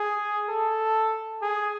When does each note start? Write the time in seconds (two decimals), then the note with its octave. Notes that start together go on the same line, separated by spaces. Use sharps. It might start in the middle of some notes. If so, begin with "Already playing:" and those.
Already playing: G#4
0.49 A4
1.42 G#4